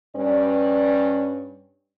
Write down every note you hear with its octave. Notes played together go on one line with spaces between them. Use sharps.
G2 G3 C#4 B4 D5